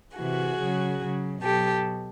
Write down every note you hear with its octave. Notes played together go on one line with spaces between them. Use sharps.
C3 E3 F#4 G#4
C#3 F#3
C#3 F#3
B2 F#3 G4 A4